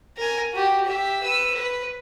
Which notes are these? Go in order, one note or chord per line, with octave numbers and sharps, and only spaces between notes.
A#4 G#5
F#4 G4
G4 E5
B4 E6
B4